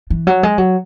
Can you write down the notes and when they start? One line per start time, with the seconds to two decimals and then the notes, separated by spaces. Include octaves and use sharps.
0.10 E3
0.27 F#3
0.43 G#3
0.58 F#3